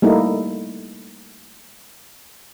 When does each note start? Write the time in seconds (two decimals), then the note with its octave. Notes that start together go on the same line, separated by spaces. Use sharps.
0.02 G3 A3 A#3 D#4 E4